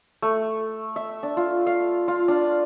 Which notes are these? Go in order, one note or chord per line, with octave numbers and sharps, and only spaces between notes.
A3
E5
D4
F4
F5
F4
D4